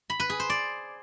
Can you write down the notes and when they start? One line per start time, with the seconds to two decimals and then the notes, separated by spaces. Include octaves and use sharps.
0.10 B5
0.20 B4
0.30 G#4
0.40 C5
0.50 D5